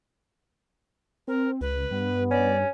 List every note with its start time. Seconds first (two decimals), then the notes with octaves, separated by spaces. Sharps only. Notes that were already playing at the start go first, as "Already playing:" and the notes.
1.28 C4 A#4
1.61 C#2 B4
1.91 G2 B3
2.31 C#4 D5